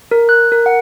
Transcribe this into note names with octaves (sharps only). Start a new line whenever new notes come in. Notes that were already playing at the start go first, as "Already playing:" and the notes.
A#4
F#6
A#4
F#5